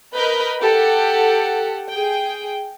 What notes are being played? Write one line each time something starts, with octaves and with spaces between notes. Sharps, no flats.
A#4 B4 D#5 B5 G6
G4 A4 F#5
G#4 G5